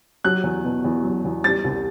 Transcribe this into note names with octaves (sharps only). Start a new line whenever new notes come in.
F#3 F#6
E2
B2
E2
F#3
E2
G3 A6
C2